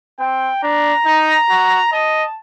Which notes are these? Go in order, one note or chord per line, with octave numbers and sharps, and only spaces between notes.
C4 G5
D4 A#5
D#4
F#4
D#5 A5